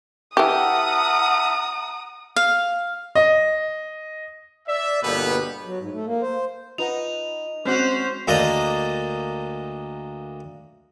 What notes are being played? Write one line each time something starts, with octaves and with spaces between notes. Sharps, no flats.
E3 G4 E5 F#5 A5 A#5 D#6 F6
F5
D#5
D5 E5
G1 B2 A#3 B3 G4 B4
F#3
G#2
A3
A#3
C5
D#4 F4 B4 F#5 F7
G#3 C4 C#4 F#4 C5
D2 A#3 D4 D5 D#5